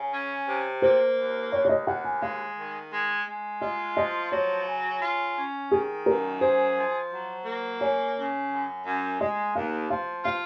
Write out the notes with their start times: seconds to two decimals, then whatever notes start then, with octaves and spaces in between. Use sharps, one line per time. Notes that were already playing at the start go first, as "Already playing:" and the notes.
Already playing: C#3
0.13 C#4
0.47 C3
0.82 A#3 C5
1.17 D#2
1.52 D#2 C#5
1.65 C#5
1.69 D#5
1.87 D#2 F#5
2.04 G#5
2.21 G#3 F5
2.57 D#3
2.91 G#3
3.27 G#3
3.61 F4 D#5
3.96 F3 D#5
4.32 F#3 C#5
4.67 C#3
5.02 F4
5.37 C#4
5.71 D#3 G#4
6.06 F#2 A#4
6.41 G#4 C5
6.75 F3
7.11 F#3
7.45 A#3
7.80 C#3 C#5
8.16 C#3
8.51 F#2
8.86 F#2
9.20 G#3 D#5
9.55 D#2 F5
9.90 F3 F5
10.25 F4 F5